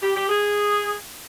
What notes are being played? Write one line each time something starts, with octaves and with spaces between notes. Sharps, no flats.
G4
G4
G#4